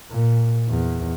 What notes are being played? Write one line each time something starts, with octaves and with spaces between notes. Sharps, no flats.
A#2
E2